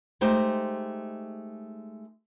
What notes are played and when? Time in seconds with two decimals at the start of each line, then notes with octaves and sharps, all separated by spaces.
0.21 G#3 A3 D#4 G4 C5